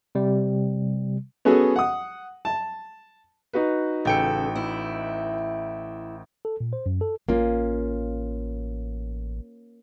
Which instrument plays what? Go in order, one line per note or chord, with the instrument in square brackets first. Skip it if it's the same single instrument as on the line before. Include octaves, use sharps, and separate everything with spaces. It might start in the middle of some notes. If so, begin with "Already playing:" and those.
[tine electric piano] C3 G3
[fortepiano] B3 C#4 F#4 G#4 A4
F#5 D#6
A5
[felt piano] D#4 F#4 B4
[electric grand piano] A1 G5 C#7 [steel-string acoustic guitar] C#3 A4
[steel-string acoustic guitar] E4
[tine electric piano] A4
A#2
C5
F#2
A4
[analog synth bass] A1 [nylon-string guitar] A#3 C#4 F4